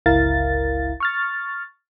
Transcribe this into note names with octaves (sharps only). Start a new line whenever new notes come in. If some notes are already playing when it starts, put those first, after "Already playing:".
G1 C#2 E4 A#4 F5 A6
C#6 F6 A6